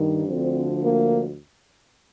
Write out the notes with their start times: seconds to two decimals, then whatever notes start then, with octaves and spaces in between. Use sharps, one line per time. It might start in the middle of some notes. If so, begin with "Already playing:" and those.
Already playing: G2 D#3
0.27 D2 D3 F3 C4
0.82 A#3